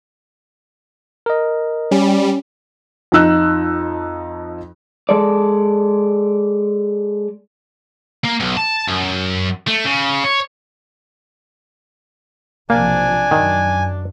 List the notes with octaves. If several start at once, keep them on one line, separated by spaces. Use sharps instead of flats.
A#4 D#5
G3 C#4
F2 F3 D#4 E6 F#6
G#3 A4 D5
A#3
B1
A5
F#2
A3
C#3
C#5
B1 C3 F3 A#3 D4 G#5
F#2 D#3